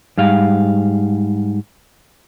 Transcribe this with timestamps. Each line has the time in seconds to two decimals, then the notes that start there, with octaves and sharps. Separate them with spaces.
0.18 G#2 G3 F5